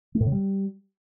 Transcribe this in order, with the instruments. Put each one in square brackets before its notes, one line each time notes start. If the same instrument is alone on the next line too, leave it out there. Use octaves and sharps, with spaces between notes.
[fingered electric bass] A3
A2
C#3
G3